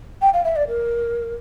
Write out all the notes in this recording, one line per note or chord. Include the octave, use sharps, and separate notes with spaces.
G5
F5
E5
D5
A#4